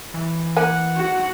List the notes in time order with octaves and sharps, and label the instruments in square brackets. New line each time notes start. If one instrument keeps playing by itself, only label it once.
[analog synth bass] E3
[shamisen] A#3 E5 G#5 [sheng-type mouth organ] F#5
[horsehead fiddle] F#4